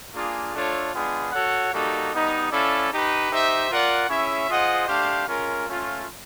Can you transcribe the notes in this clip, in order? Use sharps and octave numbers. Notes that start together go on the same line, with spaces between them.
A#3 D4 F4 G#4
A3 D4 F4 A4 C#5
G#3 B3 D4 F4 G#4
F#4 A4 C#5 F#5
G3 A#3 D#4 F#4 A4
G3 B3 D#4
C#4 E4 A4 D5 F5
D#4 G4 B4
D#4 G4 C5 E5
F4 A#4 D5 F#5
C#4 E4 G#4 C#5 E5
F4 G#4 C5 D#5 F#5
A3 D4 G4 C5 F5
G#3 C#4 F4 A#4
A3 C#4 F4